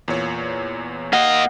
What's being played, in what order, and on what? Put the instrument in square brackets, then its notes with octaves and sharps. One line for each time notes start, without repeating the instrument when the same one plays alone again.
[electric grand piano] E2 A#2 C#5
[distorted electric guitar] A#3 D#5 [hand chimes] F#5